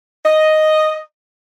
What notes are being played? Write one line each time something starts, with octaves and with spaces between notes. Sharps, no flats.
D#5